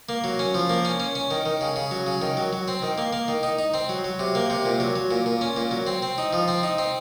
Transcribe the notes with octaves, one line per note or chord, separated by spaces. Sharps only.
A#3
F#3
C#4
F3
A#3
C#4
C#4
C#4
D#3
D#3
C#3
C#3
F#3
C#3
D#3
F#3
F#3
C4
D#3
A#3
A#3
D#3
D#4
D#4
C4
F#3
F#3
C3
A#3
C3
A#2
F#3
F#3
A#2
A#2
C#4
A#2
F#3
C4
C4
D#4
F3
C4
D#4
C4